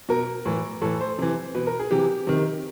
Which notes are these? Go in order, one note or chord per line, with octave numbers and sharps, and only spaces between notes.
B2 A#4
A2 E3
A2 E3 A4
C5
C3 E3
B2 B4
A#4
G#4
C3 E3 G4
C3 D#3